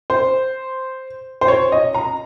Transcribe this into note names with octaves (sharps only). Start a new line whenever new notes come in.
C5
C5
C#5
D#5
A#5